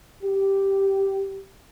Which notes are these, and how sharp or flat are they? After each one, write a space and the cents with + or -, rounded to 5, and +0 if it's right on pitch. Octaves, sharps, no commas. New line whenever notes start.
G4 -5